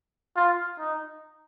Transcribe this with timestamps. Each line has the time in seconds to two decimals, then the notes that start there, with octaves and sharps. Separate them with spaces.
0.36 F4
0.79 D#4